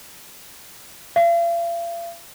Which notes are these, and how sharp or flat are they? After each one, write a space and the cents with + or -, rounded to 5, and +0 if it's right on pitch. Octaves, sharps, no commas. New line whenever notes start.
F5 -45